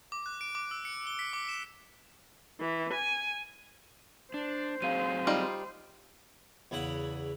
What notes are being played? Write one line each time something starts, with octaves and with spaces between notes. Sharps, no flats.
D6
F#6
D7
D6
E6
C#7
G7
B6
D6
E7
E3
G#5
D4 C5
F#3 C4 G#4 F5 D#7
G3 D#4 F4
E2 C#3 E4 F#5